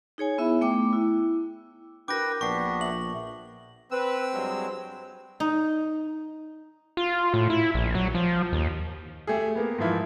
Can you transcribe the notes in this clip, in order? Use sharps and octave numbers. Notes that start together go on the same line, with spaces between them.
D#4 G#4 C#5 G#5
B3 E4 E5 B5
A3 B3 G5 D6
E4
D4 F#4 A#4 B4 G5 D6 A#6
A#1 B3 D4 G5 C#6 B6 C7
E5 C#6 F#7
C4 B4 E6
G2 F#3 G#3
D#4
F4
A2
E4
A#1
F#3
F3
D#2
A3 G4 G#4
A#3 B3
G#2 E3 F3 E4 F4